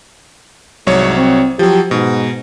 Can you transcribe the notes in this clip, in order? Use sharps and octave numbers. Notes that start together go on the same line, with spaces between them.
C2 G#2 F#3 C#5
C4
F3 F#3 G4
G#2 B2